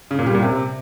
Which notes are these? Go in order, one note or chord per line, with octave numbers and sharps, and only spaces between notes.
C#3
A#2
G3
A#2
C3